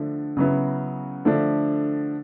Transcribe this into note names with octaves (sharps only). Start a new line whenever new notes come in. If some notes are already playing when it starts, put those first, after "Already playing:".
Already playing: D3 F3 A3 D4
C#3 F#3 B3 E4
D3 F3 A3 D4